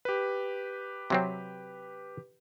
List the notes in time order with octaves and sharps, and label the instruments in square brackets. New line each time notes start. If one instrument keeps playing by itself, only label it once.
[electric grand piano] G4 B4
[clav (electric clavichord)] C3 F#3 C4